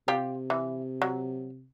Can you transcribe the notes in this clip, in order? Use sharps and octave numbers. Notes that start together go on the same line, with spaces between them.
C3 F4 G4
E3
F#3